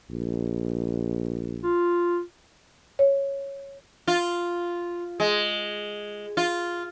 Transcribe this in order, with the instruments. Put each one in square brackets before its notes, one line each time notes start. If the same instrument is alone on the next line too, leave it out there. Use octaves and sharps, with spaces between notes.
[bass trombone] A#1
[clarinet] F4
[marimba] C#5
[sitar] F4
G#3
F4